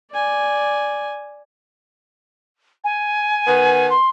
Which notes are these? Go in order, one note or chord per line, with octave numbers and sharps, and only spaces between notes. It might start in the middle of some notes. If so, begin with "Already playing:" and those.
D5 G#5
G#5
D#3 B3
C6